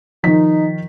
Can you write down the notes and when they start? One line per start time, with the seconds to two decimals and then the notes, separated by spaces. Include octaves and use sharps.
0.24 D#3 F3 D#4 B6